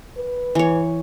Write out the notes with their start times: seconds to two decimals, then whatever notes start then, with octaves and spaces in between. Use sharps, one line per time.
0.17 B4
0.55 E3 C#5